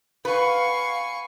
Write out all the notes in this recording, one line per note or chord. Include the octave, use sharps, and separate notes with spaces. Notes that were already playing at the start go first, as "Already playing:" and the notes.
B4 F5 F#5 G#5 C#6